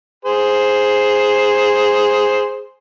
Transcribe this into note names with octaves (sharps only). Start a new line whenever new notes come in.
G#4 C5